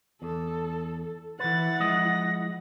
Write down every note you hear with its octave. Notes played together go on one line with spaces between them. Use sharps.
E2 A4
E3 E4 B4 F#5 A6
F3 G#3 D#5 A#6